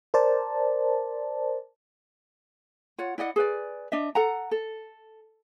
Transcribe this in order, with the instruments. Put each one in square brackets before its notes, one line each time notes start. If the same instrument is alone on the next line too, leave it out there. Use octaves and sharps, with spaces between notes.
[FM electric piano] A#4 C5 D5 A5
[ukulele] F4 C#5 F#5
E4 D5 D#5 F#5
G#4 B4 D5
D4 D#5 E5
A4 F#5 A#5
A4